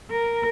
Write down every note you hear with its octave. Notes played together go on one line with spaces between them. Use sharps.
A#4